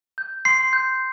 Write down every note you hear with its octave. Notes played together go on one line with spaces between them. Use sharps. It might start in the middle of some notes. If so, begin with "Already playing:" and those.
G6
C6 C7
G6